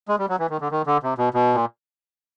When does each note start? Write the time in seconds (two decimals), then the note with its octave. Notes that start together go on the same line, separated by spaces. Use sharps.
0.08 G#3
0.19 G3
0.29 F#3
0.39 E3
0.50 D#3
0.61 D3
0.71 D#3
0.87 D3
1.03 C3
1.18 B2
1.34 B2
1.54 A#2